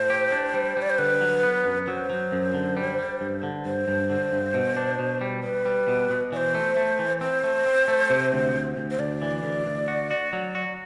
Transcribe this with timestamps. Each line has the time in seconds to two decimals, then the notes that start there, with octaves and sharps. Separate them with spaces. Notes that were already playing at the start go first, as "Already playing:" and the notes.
Already playing: A2 C5
0.10 G4
0.32 D4
0.54 G3
0.77 G3
0.82 D5
0.90 C5
0.98 D3 B4
1.21 F#3
1.43 B3
1.65 F#2
1.87 F#3 C5
2.10 F#3
2.32 F#2
2.54 D3
2.77 G3
2.99 G3
3.21 G2
3.43 D3
3.65 G2 C5
3.88 G2
4.10 D3
4.32 G2
4.54 B2
4.77 D4
4.99 B2
5.21 G3
5.43 G3 B4
5.65 G3
5.88 B2
6.10 B2
6.32 E3 D5
6.37 C5
6.54 A3
6.77 A3
6.99 E3
7.21 C4 C5
7.44 A3
7.66 C4
7.88 A3
8.10 C3
8.33 D2
8.55 D2
8.77 D2
8.91 C5
8.99 D2 D5
9.22 E3
9.44 D2
9.66 D2
9.88 F#4
10.11 F#4
10.33 F#3
10.55 F#4